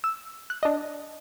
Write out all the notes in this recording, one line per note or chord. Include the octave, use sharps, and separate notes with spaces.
E6
F#6
D4 D#5